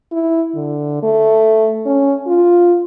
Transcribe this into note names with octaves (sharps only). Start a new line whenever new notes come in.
E4
D3
A3
C#4
F4